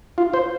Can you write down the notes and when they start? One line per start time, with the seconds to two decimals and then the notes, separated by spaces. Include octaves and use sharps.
0.18 F4
0.34 C5